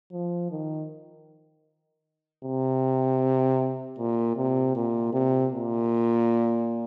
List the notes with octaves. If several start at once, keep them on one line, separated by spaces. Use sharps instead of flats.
F3
D#3
C3
A#2
C3
A#2
C3
A#2